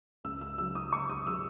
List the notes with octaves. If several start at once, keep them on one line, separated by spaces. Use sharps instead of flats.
C#2 E6
E6
C#3 F#3 E6
D#6
C#2 C#6
D#6
C#3 F#3 E6